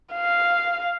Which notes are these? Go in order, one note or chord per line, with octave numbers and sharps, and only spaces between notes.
F5